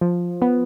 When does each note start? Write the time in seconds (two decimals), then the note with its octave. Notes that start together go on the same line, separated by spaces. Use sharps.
0.01 F3
0.42 B3